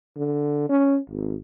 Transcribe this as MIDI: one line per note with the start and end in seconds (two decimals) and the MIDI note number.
0.17 0.67 50
0.69 0.98 61
1.10 1.36 32